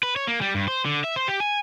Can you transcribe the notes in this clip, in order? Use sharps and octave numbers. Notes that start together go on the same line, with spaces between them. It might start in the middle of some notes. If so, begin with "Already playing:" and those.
B4
C#5
A#3
G3
G2
C5
D3
E5
C5
G4
G#5